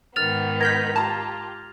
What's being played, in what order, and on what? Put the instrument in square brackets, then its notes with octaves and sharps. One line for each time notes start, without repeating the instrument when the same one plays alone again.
[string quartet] G#2 D#3 B3 [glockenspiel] F6 A6 F7
[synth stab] A#4 G6 B6 [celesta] G#6 A#6
[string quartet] F4 G4 [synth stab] A5 A#5